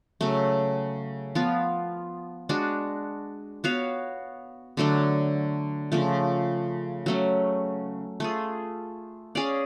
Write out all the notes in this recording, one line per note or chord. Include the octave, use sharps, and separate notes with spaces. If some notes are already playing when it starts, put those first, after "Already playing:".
C#3 F#3 A3
F3 B3 F4
G#3 D4 F#4
B3 F#4 C#5 F5
D3 F#3 A3 D4
C#3 F3 A3
F#3 A3 C#4
A3 F4 G#4
C#4 G#4 D5 F5